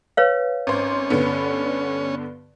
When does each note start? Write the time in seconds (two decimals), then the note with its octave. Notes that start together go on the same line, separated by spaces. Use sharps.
0.17 B4 C#5 F5
0.67 G#1 C#4 C5
1.10 G2 D3 B3